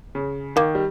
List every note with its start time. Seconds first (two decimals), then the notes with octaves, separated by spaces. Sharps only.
0.15 C#3
0.56 D#3 A#3
0.75 G3